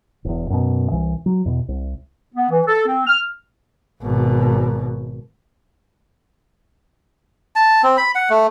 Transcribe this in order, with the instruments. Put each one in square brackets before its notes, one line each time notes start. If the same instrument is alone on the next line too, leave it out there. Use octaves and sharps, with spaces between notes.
[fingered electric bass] E1 E2
F#2 B2
C2 E3
F#3
E2 B2
C2
[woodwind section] B3
E3
A4
C4
F6
[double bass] G#1 B2
[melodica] A5
C4
B5
F#5
A3